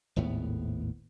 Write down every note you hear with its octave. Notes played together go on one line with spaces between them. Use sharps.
G#1 D#2 A2 B3